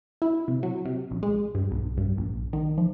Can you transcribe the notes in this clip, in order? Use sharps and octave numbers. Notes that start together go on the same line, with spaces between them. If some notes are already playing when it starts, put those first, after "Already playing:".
E4
C3
F#3
C3
A#1
G#3
G2
B1
G2
A#1
D#3
F3